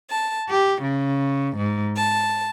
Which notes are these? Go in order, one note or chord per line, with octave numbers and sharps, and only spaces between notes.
A5
G4
C#3
G#2
A5